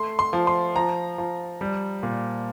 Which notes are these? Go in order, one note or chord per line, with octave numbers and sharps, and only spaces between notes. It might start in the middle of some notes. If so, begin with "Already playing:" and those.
Already playing: A3 C6
C6
F3
C6
F3 A#5
F3
G3
A#2